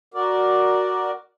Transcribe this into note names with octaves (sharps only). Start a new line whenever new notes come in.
F#4 A#4 D5